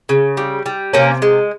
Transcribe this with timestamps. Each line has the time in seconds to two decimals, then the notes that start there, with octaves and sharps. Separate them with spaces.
0.09 C#3
0.37 G3
0.66 G3
0.93 C3 A#3 C#4
1.22 G#3